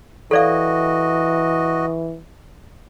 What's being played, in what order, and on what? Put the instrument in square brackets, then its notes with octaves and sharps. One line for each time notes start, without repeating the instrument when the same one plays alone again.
[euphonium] E3 [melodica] F#4 D#5 [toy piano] A4 D5 F5